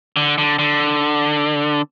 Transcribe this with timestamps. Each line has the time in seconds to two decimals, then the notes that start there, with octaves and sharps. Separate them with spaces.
0.17 D3
0.38 D3
0.59 D3